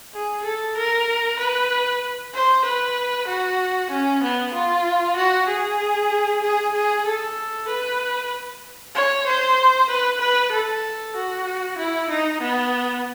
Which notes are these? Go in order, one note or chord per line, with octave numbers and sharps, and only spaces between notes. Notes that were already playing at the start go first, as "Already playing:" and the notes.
G#4
A4
A#4
B4
C5
B4
F#4
C#4
B3
F4
F#4
G#4
G#4
G#4
A4
B4
C#5
C5
B4
B4
A4
F#4
E4
D#4
B3